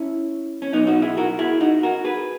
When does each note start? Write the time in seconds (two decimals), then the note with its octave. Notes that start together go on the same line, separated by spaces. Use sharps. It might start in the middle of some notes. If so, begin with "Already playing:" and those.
Already playing: C#4 E4
0.62 C#4
0.73 B1 B2 F#3 B3 D#4
0.87 D#4 F#4
1.02 E4 G#4
1.17 F#4 A#4
1.39 E4 G#4
1.61 D#4 F#4
1.83 F#4 A#4
2.05 G#4 B4